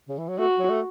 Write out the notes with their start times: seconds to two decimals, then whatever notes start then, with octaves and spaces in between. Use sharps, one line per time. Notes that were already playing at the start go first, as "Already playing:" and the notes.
0.09 C#3
0.18 E3
0.28 F#3
0.38 A3 F#4
0.59 F#3
0.70 A3